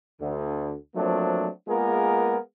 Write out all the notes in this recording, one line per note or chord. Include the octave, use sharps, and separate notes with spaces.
D2 D3
F3 F#3 A3 A#3 C4 D4
G#3 A#3 B3 F4 G#4 A#4